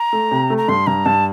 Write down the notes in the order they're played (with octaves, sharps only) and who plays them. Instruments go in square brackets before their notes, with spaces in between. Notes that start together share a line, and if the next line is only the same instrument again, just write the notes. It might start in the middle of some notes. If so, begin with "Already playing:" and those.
Already playing: [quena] A#5
[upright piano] A3
C3
A3
[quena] A#5
[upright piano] G2 [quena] C6
[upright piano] G2 [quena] A#5
[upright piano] G2 [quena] A5